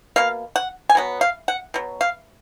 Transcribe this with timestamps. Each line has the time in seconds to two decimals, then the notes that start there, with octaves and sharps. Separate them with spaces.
0.16 B2 A#3 F5
0.56 F#5
0.89 G#5
0.95 B2 F#3 B3
1.21 F5
1.48 F#5
1.74 B2 F#3
2.01 F5